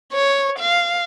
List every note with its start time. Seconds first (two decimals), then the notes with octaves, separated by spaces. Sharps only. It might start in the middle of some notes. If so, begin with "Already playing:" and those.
0.13 C#5
0.58 F5